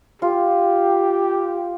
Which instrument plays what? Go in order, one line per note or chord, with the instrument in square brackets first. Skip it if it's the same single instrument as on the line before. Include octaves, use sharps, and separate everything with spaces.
[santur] F4 [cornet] G4